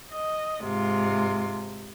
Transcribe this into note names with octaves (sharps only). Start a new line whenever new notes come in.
D#5
G#2 C3 F4